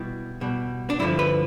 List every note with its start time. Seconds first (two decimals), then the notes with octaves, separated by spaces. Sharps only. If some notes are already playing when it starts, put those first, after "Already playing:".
Already playing: B2 G3 E4
0.41 B2 G3
0.90 D4
0.99 G2 D3 F3 E4
1.19 B4